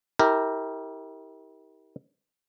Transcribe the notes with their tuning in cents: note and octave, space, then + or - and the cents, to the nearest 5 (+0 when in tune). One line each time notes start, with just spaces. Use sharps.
E4 -40 G4 +0 A#4 -15